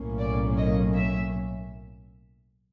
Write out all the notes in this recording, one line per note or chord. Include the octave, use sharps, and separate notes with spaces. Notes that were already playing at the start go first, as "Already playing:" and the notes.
Already playing: B1 A2 F#3 A#3 C#4
D5
D#5
E5